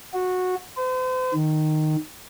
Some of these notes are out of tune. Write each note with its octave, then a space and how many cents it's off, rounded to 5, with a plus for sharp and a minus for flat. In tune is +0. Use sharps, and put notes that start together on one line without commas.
F#4 -15
C5 -40
D#3 -10